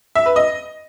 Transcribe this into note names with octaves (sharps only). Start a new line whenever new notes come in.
E5
B4
D#5